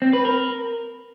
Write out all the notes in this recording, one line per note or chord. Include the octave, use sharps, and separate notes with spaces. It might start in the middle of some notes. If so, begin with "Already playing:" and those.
C4
B4
A#4